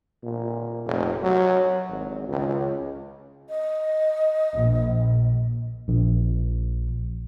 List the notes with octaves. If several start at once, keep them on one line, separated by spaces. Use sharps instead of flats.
A#2
F1
F#3
G#1
C#2
D#5
A#1
A#1